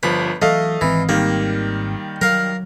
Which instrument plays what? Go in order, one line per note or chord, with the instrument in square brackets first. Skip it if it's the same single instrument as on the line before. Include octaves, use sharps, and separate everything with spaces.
[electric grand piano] G1 F3 [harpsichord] B4
[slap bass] E3 F#3 [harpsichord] A3 [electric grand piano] D#5 F5
[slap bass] G#1 C4 [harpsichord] E3
[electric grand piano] D#3 G3 [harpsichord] A#3
[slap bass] F#3 [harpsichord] A#4 F5